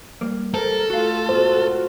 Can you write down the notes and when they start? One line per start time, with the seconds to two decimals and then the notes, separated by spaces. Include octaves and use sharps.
0.21 G3 A#3
0.54 G3 A4 A#4 C5
0.90 A3 F4 F#4 F5
1.29 G#2 B2 F4 F#4 C5